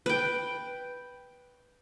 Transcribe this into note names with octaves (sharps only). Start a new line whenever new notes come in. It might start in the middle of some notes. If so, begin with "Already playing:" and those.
B4 G5